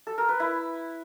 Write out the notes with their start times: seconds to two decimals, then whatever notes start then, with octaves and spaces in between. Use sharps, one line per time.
0.07 A4
0.18 A#4
0.29 B4
0.40 E4